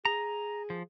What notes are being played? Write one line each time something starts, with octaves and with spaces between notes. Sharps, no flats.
G#4 A#5
F3